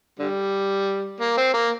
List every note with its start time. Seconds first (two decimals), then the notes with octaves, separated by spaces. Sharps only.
0.19 D3 G3
1.20 A#3
1.37 C4
1.54 A#3